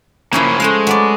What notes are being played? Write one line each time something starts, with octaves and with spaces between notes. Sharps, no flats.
C#3 F3 A#3 C#4 E4 G#4
G#3 A3 C5 F5
F#3 B4 D5